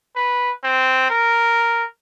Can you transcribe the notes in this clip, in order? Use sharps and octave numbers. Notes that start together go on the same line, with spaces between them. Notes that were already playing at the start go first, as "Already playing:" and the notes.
B4
C4
A#4